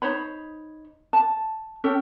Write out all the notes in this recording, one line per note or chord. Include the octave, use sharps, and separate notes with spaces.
D#4 C5 C#5 B5
A5
C#4 A4 G5